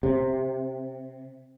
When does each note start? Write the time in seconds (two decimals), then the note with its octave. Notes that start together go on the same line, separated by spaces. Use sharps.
0.03 C3